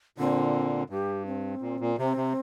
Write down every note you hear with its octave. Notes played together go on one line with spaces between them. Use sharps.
A#2 D3 C4
G2 G4
C4
A#2
A#2
C3 C4
C3